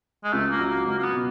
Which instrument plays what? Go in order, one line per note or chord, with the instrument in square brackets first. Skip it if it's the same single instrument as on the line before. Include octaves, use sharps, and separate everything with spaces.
[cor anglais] G#3
[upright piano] C#2 [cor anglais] A3
[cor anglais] A#3
[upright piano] F#3
[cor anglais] A#3
[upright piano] C#2 [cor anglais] A#3
[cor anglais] A#3
B3
[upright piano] B2